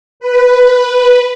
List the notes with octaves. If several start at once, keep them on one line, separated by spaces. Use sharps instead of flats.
B4